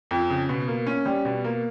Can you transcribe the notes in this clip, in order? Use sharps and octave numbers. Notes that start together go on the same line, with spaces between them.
F2
C#3
B2
A#3
C#4
G3
B2
A#3